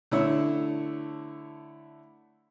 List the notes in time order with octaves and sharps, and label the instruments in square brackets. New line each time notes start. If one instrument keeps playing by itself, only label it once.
[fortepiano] D3 A3 E4 C#5 E6